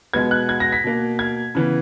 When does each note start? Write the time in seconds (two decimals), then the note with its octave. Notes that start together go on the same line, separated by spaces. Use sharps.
0.14 B2 G#3 B3 G#6
0.31 F#6
0.49 G#6
0.60 A#6
0.72 B6
0.84 B2 A#3
1.19 G#6
1.55 C#3 E3 B3